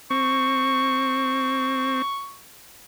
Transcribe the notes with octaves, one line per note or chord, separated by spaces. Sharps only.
C4 C#6